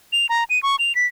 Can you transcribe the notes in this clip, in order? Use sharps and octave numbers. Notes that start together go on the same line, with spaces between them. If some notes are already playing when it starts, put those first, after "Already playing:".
F7
A#5
D#7
C#6
F7
B6